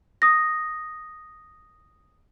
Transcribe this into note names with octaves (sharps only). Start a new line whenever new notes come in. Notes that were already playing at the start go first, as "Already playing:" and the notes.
D#6 A#6